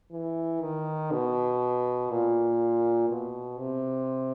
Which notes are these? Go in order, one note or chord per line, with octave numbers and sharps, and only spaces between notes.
E3
D#3
B2
A#2
B2
C3